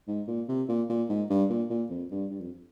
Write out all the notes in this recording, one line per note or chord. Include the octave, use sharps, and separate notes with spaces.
G#2
A#2
C3
A#2
A#2
G#2
G2
A#2
A#2
F2
G2
G2
F2